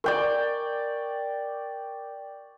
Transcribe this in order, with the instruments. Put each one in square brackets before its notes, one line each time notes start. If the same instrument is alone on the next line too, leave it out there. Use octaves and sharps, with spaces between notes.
[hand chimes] A#4 [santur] D5 G5 C#6